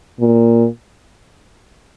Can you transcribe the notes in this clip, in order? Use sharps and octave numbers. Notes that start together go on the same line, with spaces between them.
A#2